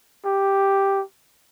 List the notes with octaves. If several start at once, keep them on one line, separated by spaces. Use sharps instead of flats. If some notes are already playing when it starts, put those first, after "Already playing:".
G4